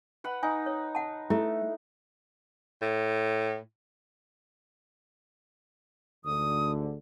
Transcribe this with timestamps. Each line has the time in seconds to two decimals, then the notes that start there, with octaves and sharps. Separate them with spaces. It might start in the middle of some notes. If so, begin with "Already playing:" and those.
0.24 B4 F#5 B5
0.43 D#4 G#5
0.66 C#5
0.95 F#5 A5
1.30 A3 E4
2.82 A2
6.25 D2 G#2 D3 D#6